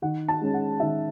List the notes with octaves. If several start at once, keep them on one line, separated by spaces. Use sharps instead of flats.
D#3 F#5
A5
G#3 C#4
F#5
D#3 E5